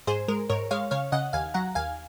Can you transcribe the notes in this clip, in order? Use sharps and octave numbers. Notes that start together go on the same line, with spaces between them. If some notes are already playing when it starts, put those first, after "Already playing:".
G#2 G#4 C5
G#3 A#4
G#2 A#4 C#5
G#3 C#5 F5
C#3 C#5 F5
C#3 D#5 F#5
D#2 F5 G#5
F#3 F#5 A#5
D#2 F5 G#5